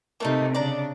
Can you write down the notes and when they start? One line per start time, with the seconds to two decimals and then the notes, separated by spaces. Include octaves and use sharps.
0.20 C3 A3 A#3 D4 D#4
0.55 C#3 D4 D5 A#5